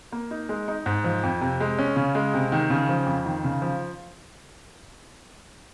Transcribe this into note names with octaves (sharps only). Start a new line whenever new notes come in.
A#3
D#4
G#3
D#4
G#2
F3
F2
C3
G#3
C#4
C#3
G#3
C3
D#3
C#3
F3
F2
D#3
C#3
F3